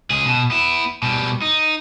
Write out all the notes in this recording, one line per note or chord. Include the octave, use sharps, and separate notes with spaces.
C#2 G#4
B2
B3 E4
B2 G3
D#4